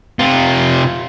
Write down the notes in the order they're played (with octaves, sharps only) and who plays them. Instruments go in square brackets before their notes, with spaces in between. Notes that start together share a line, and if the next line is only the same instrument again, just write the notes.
[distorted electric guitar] C3 F4